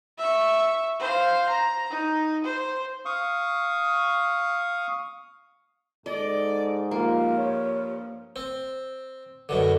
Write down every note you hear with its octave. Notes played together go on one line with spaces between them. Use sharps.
E5 C#6
C5 F5
A#5
D#4
C5
F5 C#6 D#6
G#2 A4 D5 D#5
G2 F3 A#3 F4
C#5
C4
F#2 B2 D3